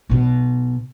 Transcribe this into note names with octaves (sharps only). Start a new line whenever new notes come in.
B1 B2